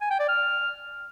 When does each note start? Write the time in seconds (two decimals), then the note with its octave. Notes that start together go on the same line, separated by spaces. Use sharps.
0.01 G#5
0.10 G5
0.20 D5
0.29 F6